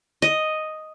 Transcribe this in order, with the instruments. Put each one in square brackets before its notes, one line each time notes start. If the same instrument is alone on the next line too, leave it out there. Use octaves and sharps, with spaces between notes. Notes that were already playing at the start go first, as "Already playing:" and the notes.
[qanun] D#5